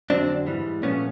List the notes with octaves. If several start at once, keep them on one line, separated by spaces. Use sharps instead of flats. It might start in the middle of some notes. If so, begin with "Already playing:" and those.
F2 D3 F#3 C4 D4
G#2 E3 G3
A#2 F3 A3 B3 C#4